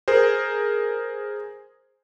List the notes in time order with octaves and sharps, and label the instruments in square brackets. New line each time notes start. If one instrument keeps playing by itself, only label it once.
[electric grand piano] G#4 A#4 C5